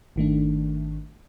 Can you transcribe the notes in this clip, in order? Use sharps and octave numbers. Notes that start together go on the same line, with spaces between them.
G#1 D#3 A3 D4